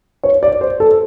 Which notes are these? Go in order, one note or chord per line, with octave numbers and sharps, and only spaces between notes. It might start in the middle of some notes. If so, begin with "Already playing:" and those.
C#5
D5
C5
A4